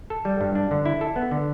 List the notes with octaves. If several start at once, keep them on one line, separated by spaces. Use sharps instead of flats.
A4
G3
G2
D4
D3
E4
A4
B3
D3